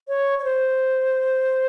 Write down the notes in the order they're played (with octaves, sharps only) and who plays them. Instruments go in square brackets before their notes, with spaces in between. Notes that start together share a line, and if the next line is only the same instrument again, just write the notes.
[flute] C#5
C#5
C5